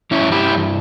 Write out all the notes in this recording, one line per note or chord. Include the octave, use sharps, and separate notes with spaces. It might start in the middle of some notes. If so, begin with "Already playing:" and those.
G2 E3 C#4 E4
E4 G4